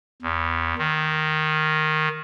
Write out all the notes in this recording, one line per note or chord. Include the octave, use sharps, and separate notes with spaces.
E2
D#3